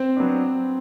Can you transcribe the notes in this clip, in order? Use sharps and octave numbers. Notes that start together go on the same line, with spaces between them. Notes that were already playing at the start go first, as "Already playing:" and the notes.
Already playing: C4 C5
F#3 B3 D4